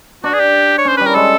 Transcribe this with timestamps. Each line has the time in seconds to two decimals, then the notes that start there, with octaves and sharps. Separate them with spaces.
0.24 D4 F#4
0.34 G#4
0.40 G4
0.78 C#5
0.85 C#4 C5
0.97 G3 B4
1.06 A#4
1.15 G#3 A4